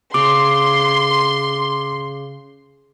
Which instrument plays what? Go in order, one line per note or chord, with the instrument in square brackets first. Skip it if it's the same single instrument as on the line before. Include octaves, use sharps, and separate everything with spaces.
[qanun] C#3 [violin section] C6 [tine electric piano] D6